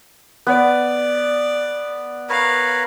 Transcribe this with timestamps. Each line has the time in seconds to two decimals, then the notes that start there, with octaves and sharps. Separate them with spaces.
0.47 B3 D5
2.29 A#4 B4 C#5 F5